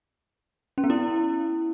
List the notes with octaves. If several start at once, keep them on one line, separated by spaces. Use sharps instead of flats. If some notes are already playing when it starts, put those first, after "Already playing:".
C#4
B3
E4